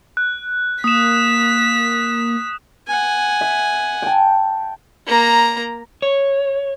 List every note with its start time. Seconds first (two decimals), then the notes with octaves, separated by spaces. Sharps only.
0.17 F#6
0.84 A#3 D#6 B6 E7
2.87 F#5 G#5
3.41 E5
4.02 G5 A5
5.07 A#3 A#5
6.02 C#5